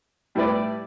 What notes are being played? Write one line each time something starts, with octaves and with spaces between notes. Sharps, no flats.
A2 G3 E4 B4 D5